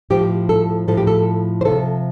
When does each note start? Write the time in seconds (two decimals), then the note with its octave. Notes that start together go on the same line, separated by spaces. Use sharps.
0.10 A2 F3 G4
0.49 A4
0.88 A2 F3 A4
0.97 G4
1.07 A4
1.61 C5
1.65 C3 F3 A4